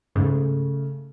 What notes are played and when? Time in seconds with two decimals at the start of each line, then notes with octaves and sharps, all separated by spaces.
0.15 G#2 C#3 A3